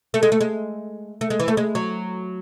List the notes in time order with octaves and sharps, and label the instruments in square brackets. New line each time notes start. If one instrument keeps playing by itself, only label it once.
[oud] A3
G#3
A3
G#3
A3
G#3
E3
A3
G#3
F#3